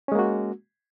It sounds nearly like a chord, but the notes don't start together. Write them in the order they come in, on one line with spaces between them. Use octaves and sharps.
C#4 G#3 A#3 F#4